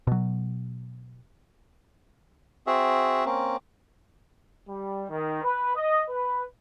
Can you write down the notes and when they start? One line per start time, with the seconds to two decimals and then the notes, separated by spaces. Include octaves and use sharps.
0.07 B2 F#3
2.67 C4 F#4 G#4 E5
3.25 A#3 C4 C#4
4.69 G3
5.10 D#3
5.44 B4
5.75 D#5
6.09 B4